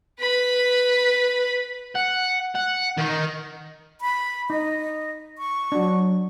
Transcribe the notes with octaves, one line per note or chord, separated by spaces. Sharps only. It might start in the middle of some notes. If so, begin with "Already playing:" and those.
B4 B5
F#5
F#5
D#3 D#4
B5
D#4 D#5
C#6
F#3 D4 F#4